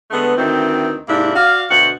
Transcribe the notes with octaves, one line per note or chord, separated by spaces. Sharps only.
D3 G#3 A3 B3
D2 D#3 E3 C4
G#2 C3 A#3 D4 E4
F#4 D5 F5
D2 B2 F#4 C5 F#5